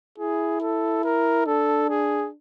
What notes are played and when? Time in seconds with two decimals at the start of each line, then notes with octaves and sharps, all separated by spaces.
0.18 E4 G#4
0.61 A4
1.05 A#4
1.46 D4 A4
1.90 G#4